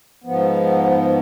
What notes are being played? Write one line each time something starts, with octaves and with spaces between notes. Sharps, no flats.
G#2 F3 B3